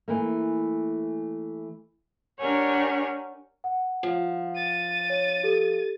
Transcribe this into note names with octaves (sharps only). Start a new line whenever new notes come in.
E3 A3 A#3
D4 G4 A#4 C#5 F#5 G#5
F#5
F3
A6 D#7
C#5
G4 A4